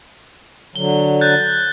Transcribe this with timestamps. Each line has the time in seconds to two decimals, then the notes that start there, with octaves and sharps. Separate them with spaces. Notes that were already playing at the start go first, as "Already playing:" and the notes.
0.76 D3 F#3 G7
1.21 F#6 G6 A6